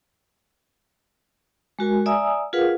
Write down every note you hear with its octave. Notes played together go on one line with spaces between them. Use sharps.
G#3 F#4 A#4 G#5
D5 E5 G#5 A#5 D#6 E6
F4 G#4 A#4 B4 F5 F#5